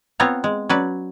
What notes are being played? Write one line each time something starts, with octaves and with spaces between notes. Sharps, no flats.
B3 C4 F4 C#5 A#5
G#3
F#3 C#4 B4 D5